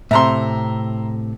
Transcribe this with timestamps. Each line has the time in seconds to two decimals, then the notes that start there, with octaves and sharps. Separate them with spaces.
0.11 A2 C3 E5 A#5 C6